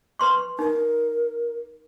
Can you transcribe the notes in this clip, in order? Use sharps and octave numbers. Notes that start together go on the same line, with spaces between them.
B4 C6 C#6
D#4 A#4